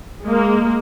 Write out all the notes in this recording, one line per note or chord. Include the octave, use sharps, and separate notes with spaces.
G#3 A#3